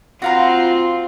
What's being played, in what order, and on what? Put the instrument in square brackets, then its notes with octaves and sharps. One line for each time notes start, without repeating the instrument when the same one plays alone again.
[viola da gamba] C4 F4 [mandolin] F#4 F5 A#5